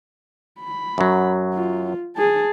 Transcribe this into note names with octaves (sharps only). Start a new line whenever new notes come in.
B5
F#2 F#3
F4
G#4 A5